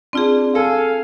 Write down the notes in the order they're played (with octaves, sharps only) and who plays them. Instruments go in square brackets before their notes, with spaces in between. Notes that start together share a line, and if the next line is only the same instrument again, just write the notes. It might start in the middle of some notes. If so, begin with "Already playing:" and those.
[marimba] C4 F4 G#4 [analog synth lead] D4
[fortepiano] A4 [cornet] F5 [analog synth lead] G#5